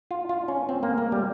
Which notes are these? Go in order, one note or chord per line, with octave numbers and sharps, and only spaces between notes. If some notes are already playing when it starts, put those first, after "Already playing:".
F4
F4
C#4
C4
A#3
A#3
G3